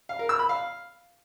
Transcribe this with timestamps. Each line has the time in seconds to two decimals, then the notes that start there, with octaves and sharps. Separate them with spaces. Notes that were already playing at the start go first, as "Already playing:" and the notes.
0.09 F5
0.19 A#4
0.29 E6
0.39 B5
0.49 F5